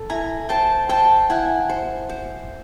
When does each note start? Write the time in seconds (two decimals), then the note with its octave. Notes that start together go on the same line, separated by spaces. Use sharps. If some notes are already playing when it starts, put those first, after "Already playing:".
Already playing: A4
0.10 E4 G#5 A#5
0.49 C5 G5 A5
0.89 C5 G5 A5
1.30 E4 F#5 G#5
1.69 C5
2.09 C5